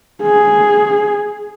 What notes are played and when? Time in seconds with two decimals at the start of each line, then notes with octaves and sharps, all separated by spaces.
0.22 G#4